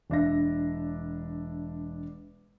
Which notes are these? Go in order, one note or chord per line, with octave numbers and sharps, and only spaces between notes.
E1 D4 E5 A#6